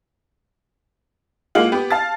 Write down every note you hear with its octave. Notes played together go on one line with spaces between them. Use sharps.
G#3 A#3 F4 F#5 F#7
B3 G4
F5 A5 A6